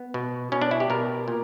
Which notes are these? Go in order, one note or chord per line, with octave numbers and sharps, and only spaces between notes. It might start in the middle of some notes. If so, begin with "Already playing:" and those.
Already playing: B3
B2
B2 C#4
D4
E4
G4
B2 A#4
A#2